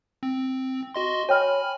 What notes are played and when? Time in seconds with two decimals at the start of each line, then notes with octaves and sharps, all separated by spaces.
0.23 C4
0.94 F#4 D#5 C6
1.29 C#5 G5 G#5 B5 F6